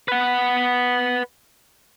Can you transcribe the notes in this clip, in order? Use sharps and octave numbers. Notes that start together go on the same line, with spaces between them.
B4 F#5